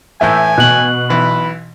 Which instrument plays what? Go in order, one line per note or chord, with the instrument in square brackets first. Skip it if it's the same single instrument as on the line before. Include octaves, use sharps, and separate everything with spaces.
[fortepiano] A2 E3 A3 [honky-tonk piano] E5 G6 [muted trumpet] G#5
[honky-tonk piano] B2 [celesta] F#6 F#7
[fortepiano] B1 E3 [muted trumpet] B5